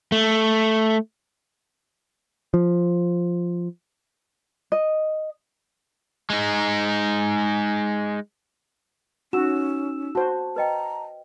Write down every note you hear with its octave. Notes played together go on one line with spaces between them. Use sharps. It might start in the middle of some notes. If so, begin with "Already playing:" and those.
A3
F3
D#5
G#3 D#4
C#4 D#4 F#4 E6 E7
F#4 C5 A5
B4 D#5 G5 A#5